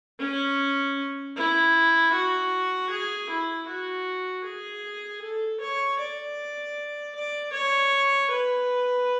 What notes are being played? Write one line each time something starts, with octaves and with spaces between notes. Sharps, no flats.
C#4
E4
F#4
G#4
E4
F#4
G#4
A4
C#5
D5
D5
C#5
B4